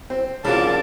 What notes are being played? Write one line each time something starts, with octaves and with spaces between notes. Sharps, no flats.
C4
C2 C#3 F4 A#4 D5 A5